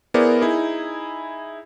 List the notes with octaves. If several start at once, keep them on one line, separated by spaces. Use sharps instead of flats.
B3 E4 G#4 A#4 C5 D5
D#4 E4 G#4